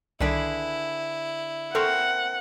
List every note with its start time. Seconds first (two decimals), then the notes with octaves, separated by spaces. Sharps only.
0.20 C2 D3 D#3 E4 G#4 B4 D7
1.75 C4 A4 A#4 F#5 C6 C#6